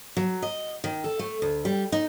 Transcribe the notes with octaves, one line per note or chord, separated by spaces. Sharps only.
F#3
D#5
D#3
A4
A3
D2
G3
D#4